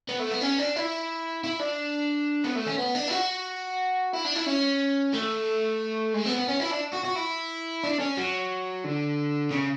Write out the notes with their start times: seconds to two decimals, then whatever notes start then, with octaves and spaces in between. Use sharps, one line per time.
0.09 B3
0.20 A3
0.31 B3
0.42 C#4
0.59 D4
0.76 E4
1.44 E4
1.60 D4
2.44 B3
2.56 A3
2.67 C#4
2.78 B3
2.95 D4
3.08 E4
3.11 F#4
4.13 E4
4.25 D4
4.36 E4
4.46 C#4
5.14 A3
6.14 G#3
6.26 B3
6.38 B3
6.48 C#4
6.60 E4
6.71 D4
6.93 F#4
7.04 F#4
7.15 E4
7.84 D4
8.00 C#4
8.17 F#3
8.84 D3
9.51 C#3